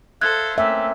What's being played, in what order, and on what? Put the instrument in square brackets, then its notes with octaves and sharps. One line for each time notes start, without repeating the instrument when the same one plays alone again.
[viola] A4 C5 [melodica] E5 F5 [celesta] F#6 G#6
[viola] A3 [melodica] A#3 C4 C#4 [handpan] E5